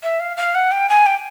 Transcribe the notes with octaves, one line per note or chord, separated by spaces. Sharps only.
E5
F5
F5
F#5
G5
G#5
G5